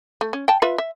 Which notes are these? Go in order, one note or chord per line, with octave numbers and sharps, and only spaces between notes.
A3
C#4
G5 A5
F4 B4 E5
E5